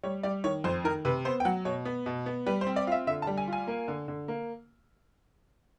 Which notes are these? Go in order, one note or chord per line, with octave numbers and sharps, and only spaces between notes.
G3 C#5
G3 D5
D#3 C#5
F2 C5
D#3 A#4
C3 B4
B3 C5
G5
F#3 F#5
B2 C#5
B3
B2
B3
G3 B4
C5
C4
D5
F4 E5 F5
D3 E5
A5
G3
G#5
F4
G#5
A#3
D3
D3
A#3